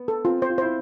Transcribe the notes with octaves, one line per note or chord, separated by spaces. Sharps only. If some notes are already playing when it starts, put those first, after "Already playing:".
Already playing: B3
A4
C4 F4
C5
F4
E4 C5